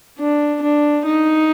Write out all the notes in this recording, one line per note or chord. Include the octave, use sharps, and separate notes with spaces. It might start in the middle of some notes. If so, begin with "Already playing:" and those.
D4
D4
D#4